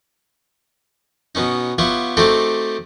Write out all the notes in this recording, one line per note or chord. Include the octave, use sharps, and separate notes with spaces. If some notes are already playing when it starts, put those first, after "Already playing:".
B2 B3 C#4 D#4
B3 F4 G4 C#5 E5 F#5
A3 C4 D#4 F#4 G4 A4